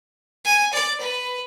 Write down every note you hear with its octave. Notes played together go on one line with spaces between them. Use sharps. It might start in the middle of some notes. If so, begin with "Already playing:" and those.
G#5
D5
B4